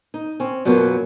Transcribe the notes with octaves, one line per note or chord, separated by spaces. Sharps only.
D#4
C4 C#4
F#2 B2 F#3 A#3 B3 F4